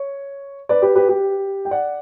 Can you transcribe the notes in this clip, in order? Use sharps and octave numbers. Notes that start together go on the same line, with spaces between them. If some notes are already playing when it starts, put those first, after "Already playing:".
Already playing: C#5
B4 D5
G4 B4
G4 B4
G4
G5
D5 F#5